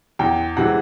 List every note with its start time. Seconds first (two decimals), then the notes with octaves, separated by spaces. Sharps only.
0.19 E2 G5
0.57 C3 E3 G#3 F#5